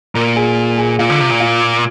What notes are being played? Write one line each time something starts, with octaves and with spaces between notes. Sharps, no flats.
A#2 A#4 A#5
G#4 G#5
G#4 G#5
A#2 F4 F5
D3
C3
A#2
F4 F5